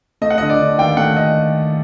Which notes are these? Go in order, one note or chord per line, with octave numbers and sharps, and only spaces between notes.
A3 D#5
F#5
D3 D#5
D5
D3
D#2 G5
A3 F#5
D#5